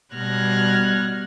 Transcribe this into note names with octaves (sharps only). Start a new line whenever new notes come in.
B2 G3 F6 F#6 G#6 A#6